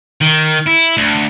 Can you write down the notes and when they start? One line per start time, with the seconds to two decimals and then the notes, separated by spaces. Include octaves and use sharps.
0.22 D#3
0.68 E4
0.97 D2